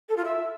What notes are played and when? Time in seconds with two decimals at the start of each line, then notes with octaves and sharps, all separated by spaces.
0.09 A4
0.17 F4
0.25 E5